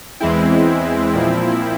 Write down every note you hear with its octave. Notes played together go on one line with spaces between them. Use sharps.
E2 E3 G#3 C4 E4
A#2 F3 C4